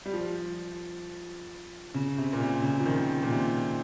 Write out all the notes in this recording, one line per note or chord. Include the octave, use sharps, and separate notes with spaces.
G3
F3
C#3
C3
A#2
C3
C#3
F3
D#3
A#2
C3